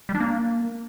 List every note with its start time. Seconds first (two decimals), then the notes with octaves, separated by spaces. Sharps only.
0.09 G3
0.15 D4
0.20 A#3